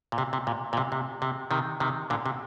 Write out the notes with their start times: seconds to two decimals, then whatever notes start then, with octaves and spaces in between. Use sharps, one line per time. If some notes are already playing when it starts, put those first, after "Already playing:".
0.12 A#2
0.18 C3
0.33 C3
0.47 A#2
0.73 A#2
0.77 C3
0.92 C3
1.22 C3
1.51 C3 D#3
1.80 C3 D#3
2.10 A#2 D3
2.26 C3